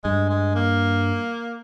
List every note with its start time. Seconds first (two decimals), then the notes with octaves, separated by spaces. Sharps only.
0.04 G2 G#3
0.30 G#3
0.55 A#3